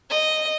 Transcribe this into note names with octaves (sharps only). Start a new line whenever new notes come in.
D#5